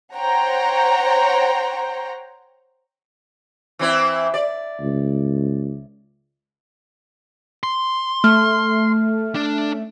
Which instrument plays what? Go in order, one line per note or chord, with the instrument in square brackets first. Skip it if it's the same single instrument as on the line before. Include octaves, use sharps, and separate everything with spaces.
[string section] C5 C#5 F#5 G5 A#5
[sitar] E3 C4 E4
D5
[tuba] C#2
[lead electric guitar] C6
[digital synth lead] A3 [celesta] F6
[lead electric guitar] D4